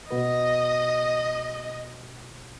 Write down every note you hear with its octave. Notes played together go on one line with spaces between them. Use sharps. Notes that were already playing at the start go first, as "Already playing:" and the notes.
B2 B3 F#4 B4 D#5